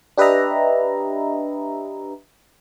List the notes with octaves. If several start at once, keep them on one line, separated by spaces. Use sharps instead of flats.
D4 G4 B4 D#5 E5 A#5